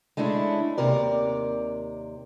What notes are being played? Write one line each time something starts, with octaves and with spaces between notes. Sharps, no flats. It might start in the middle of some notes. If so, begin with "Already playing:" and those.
G#3 A3 C#4 D4 E4
D#2 C3 A#4 D5